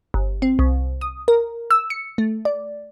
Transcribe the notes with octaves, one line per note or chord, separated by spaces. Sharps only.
G1
C4
C2
D#6
A#4
E6
C#7
A3
D5